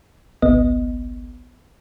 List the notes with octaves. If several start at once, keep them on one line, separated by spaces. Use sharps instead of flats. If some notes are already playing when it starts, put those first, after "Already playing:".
G#1 C#2 B3 D#5